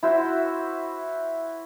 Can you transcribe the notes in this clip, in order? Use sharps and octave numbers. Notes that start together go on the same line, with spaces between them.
E4 F#4 C5 E5